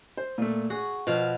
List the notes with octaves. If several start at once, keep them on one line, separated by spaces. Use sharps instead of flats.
C5
A#2 A3
F#4 G#4
B2 F3 F5